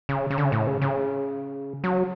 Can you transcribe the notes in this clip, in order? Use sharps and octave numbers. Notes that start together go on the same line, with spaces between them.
C#3
C#3
D3
C#3
A2
C#3
C#3
F#3